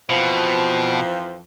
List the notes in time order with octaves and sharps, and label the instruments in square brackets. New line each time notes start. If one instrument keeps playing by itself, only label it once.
[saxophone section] F2 E3 F3 [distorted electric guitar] B2